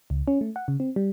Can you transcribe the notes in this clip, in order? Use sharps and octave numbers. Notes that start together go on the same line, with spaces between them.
C#2
C#4
A3
F#5
C#3
C4
G3